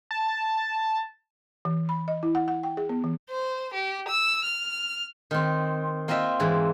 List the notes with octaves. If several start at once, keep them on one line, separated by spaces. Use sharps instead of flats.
A5
E3
B5
D#5
E4
F#5
F#5
G5
G#4
B3
E3
C5
G4
E6
F6
D#3 C4
A#3 C4 F4 D#5 E5 G5
G#2 E3 D5